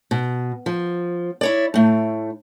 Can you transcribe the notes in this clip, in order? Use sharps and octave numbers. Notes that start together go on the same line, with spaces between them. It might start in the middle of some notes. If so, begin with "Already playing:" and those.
B2
F3
E4 C#5 D5
A2 A3